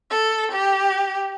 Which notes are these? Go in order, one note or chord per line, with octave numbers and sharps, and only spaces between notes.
A4
G4